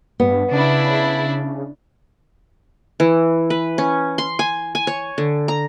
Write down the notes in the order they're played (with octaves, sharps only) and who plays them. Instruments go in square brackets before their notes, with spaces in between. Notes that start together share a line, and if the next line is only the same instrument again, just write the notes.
[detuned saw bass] G2 [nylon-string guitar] B3
[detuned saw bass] C#3 [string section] D4 E4
[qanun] E3
B4
C#4
C6
G#5
G#5
C#5
D3
A#5